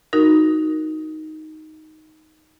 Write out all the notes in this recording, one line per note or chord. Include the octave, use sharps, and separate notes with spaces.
D#4 F#4 A#4